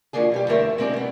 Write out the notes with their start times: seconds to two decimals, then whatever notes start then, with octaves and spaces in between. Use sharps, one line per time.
0.13 D3 F3 F#3 A#3 D4 G#4
0.32 B2 G3 G4
0.48 E2 D3 A3 A#4 C5 E5
0.78 G#3 B3 C4 D4 D#4 G4
0.93 B2 B3